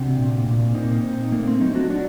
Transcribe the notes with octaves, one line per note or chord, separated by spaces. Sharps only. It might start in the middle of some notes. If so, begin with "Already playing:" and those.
Already playing: C3 D4 F#4
A#2
A#2
A#3 C4 D#4
A#2
A3 A#3
C4
F#3 C4 D#4
D4 F#4
F#3 D4 F#4